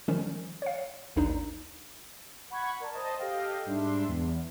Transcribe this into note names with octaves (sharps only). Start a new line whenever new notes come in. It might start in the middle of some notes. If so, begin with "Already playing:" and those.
D#3 F3 G3 C#4
C#5 F5
A1 D#2 D4 D#4
F#5 B5 C#6 G#6
A#4 D5 A5
C5 D#5 A5
G4 A4 D#5 F5 G5
G#2 G3 D4 E5 C6
E2